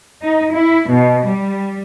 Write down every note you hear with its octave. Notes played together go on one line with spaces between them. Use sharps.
D#4
E4
B2
G3